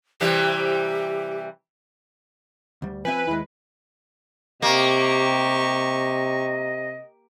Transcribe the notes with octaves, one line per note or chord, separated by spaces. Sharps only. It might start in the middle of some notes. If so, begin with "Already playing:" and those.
C3 E3 G3 G4
D2 G3
F3 C4 B4 E5 G#5
D#2 G#3 E4
C3 A#3 G4 D#5 C#6